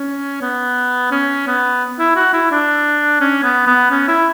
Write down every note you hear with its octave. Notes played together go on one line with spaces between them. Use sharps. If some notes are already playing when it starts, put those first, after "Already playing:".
Already playing: C#4
B3
C#4
B3
E4
F#4
E4
D4
C#4
B3
B3
C#4
E4